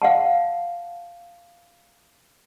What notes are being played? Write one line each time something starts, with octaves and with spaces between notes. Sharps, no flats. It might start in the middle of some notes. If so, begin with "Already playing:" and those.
F5 F#5 A5